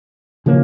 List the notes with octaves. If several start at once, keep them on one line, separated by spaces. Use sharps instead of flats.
C#3 F3 A#3 C#4